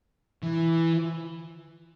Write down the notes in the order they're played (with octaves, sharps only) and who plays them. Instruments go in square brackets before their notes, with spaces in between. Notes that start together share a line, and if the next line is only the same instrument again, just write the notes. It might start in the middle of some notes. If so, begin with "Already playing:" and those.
[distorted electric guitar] E3